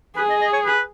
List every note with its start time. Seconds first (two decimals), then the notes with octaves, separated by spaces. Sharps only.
0.16 G#4 B4
0.29 D#5
0.41 D#5
0.53 C#5
0.66 B4